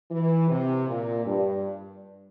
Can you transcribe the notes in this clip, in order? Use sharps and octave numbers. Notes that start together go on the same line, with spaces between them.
E3
C3
A#2
G2